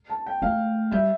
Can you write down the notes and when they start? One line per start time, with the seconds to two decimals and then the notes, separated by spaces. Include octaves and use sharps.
0.10 A5
0.26 G5
0.42 A3 F5
0.91 G3 E5